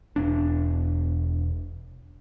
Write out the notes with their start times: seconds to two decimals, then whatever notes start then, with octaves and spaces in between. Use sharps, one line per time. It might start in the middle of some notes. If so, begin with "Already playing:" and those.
0.16 E1 D4